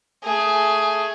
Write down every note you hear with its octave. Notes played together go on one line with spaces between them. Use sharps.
A3 G#4